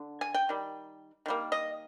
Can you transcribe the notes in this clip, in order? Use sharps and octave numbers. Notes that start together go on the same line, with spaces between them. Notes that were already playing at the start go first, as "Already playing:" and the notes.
Already playing: D3
G#5
G5
D#3 G3
D#3 G3 A#3
D#5